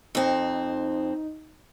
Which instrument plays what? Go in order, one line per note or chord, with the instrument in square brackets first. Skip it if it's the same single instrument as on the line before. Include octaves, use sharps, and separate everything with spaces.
[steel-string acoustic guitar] F2 C4 [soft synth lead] D#4